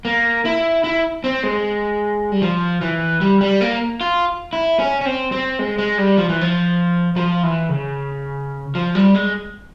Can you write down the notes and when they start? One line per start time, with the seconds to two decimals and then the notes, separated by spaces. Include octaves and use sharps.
0.05 A#3
0.45 E4
0.84 E4
1.24 C4
1.43 G#3
2.32 G3
2.42 F3
2.81 E3
3.21 G3
3.41 G3
3.61 A#3
4.01 F4
4.53 E4
4.79 C#4
5.01 C#4
5.05 C4
5.32 C4
5.59 G#3
5.78 G#3
5.98 G3
6.18 F3
6.29 E3
6.41 F3
7.16 F3
7.43 E3
7.69 C#3
8.75 F3
8.95 G3
9.14 G#3